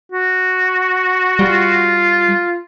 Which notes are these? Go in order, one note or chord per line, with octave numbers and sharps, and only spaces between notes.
F#4
G3 F4